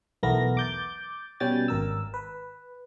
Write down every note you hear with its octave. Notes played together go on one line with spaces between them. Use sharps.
B1 E2 A3 B3 A#4 A#6
D6 G6 A6
B2 G3 C#4 G5 G#5 A6
G#1 A#4 E6
B4